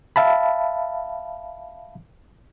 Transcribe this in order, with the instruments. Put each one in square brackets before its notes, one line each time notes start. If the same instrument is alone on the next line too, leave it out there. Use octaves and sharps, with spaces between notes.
[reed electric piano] E5 F5 A5 B5